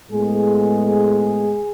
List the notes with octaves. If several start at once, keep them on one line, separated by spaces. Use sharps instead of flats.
A2 G#3 B3 G#4